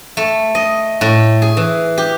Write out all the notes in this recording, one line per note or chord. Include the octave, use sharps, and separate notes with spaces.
A3
D#5
A2
G#4
E3
G4